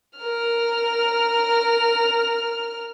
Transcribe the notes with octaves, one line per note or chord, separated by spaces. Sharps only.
A#4 F6